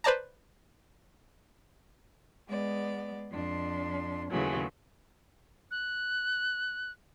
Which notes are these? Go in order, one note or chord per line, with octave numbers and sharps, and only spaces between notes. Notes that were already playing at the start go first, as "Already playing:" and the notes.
B4 C5 D5 A5 A#5
G#3 B3 D5
F2 D4 C6
D#2 C#3 E3 F#3 G#3 A3
F#6